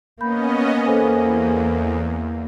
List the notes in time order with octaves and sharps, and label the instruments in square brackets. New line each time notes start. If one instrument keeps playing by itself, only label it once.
[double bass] A#3 [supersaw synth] B3 C#4 D#5 [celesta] B5 G6
[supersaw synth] E2 [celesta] A4 C5 G#5